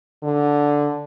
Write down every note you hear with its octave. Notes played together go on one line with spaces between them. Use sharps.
D3